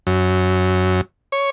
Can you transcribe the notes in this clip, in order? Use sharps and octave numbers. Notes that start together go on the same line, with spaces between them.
F#2
C#5